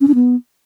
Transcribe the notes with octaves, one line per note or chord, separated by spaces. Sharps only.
C#4
D4
B3